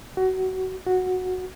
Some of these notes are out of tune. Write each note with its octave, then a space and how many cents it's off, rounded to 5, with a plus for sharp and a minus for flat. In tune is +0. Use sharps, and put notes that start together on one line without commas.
F#4 +25
F#4 -5